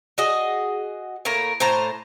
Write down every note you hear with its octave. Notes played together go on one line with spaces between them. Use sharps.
F#4 G#4 D#5 F#5
A2 A#3 A#4 A#5
A2 C5 A5 A#5